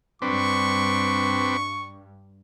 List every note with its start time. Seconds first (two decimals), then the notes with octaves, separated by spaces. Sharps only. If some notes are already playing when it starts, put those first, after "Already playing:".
0.22 G2 C4 D4 B4 C#6